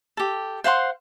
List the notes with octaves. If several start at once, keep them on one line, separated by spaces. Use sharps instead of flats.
G4 A4
C5 F5 F#5 C6